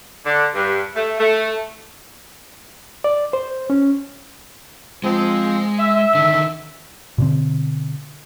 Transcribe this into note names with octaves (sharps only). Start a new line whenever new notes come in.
D3
G2
A3
A3
D5
C5
C#4
F3 G#3 C4
E5
D3 D#3
B2 D3 C4